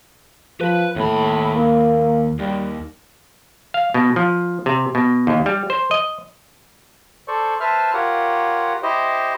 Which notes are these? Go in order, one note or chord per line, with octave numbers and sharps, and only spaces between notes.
F3 B4
D#2 A2 B5
A#3
D#2 G3
F5
B2
F3
C3
B2
D#2
G3
C5
D#5
A4 C5 D5 C#6
B4 C5 E5 A5 F6
F4 G4 A#4 C#5 F#5
E4 G4 C5 D#5